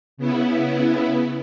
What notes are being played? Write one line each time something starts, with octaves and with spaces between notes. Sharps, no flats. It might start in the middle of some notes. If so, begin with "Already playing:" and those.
C#3 B3 E4